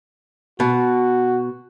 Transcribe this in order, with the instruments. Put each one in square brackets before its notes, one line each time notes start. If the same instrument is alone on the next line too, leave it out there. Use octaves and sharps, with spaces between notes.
[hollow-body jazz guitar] B2 [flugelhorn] F#4